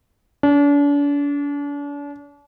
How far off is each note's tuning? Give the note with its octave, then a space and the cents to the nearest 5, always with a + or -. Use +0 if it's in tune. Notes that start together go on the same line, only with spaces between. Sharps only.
D4 -40